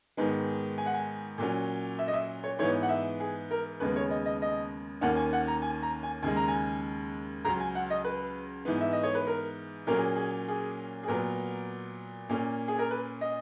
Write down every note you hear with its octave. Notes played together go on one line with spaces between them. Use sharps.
G#2 D#3 G#3 B3
G#5
F#5
G#5
A#2 F#3 C#4
E5
D#5
E5
C#5
G#2 E3 B3 C#5
F#5
E5
G#4
A#4
D#2 C#3 G#3 B3 B4
C#5
D#5
D#5
D#5
D#2 D#3 A#3 C#4 F#5
G#5
F#5
A#5
G#5
A#5
G#5
D#2 C#3 G#3 G#5
A#5
G#5
C#2 C#3 F#3 A#5
G#5
F#5
D#5
B4
G#2 E3 B3
E5
D#5
C#5
B4
A#4
A#2 F#3 A#3 C#4 A#4
G#4
G#4
G#4
G#4
A#2 F#3 B3 A#4
A#2 A#3 C#4
G#4
A#4
B4
D#5